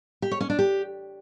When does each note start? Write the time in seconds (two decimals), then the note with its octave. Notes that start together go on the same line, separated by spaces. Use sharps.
0.22 G4
0.31 C#5
0.41 C#4
0.50 D4
0.59 G4